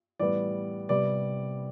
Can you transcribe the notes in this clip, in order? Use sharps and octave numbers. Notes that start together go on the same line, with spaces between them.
A2 E3 G3 B3 D5
C3 G3 B3 D5